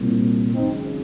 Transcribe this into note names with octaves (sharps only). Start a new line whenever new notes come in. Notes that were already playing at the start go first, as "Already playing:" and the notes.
Already playing: C2 A#2
G#1 F#2 C#3 C4 D#4